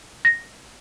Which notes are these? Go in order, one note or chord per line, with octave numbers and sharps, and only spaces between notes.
A#6